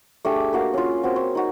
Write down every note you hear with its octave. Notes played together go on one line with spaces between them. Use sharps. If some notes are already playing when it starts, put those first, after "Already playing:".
A3 D4 G4 G#4
A#3 F#4 F5
C#4 F4
C4 F#4
C#5
D#4 F#4